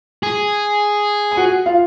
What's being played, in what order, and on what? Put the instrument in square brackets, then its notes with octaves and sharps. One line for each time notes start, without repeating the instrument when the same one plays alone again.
[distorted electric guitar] G#4
[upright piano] G#5
F#4 F#5
F4 F5